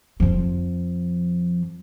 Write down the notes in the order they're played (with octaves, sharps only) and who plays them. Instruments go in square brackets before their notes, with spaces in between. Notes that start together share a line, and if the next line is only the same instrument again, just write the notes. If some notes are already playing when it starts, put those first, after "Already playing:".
[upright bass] F2 F3